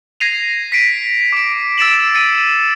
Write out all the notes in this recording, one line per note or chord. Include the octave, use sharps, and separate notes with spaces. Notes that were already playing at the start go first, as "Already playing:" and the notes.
G#6 A#6 C7 D#7 F7
B6 C7 D7 D#7
D6 D7
E6 A6 D7 E7 F#7
A6 C#7 D#7